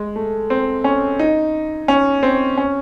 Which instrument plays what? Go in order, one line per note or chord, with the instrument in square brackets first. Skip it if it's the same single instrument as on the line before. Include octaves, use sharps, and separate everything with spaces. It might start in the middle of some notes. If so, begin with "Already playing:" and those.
Already playing: [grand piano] G#3
A3
C4
C#4
D#4
C#4
C4
C#4